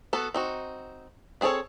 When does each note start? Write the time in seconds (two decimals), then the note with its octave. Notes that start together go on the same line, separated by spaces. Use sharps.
0.13 B3 F#4 A4
0.34 C4 D#4 F#4
1.41 B3 C4 G#4 A4 C#5